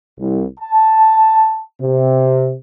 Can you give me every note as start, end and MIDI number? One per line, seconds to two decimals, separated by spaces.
0.19 0.44 36
0.60 1.60 81
1.80 2.54 48